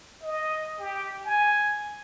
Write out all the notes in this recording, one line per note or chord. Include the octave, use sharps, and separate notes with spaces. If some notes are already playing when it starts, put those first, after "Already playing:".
D#5
G4
G#5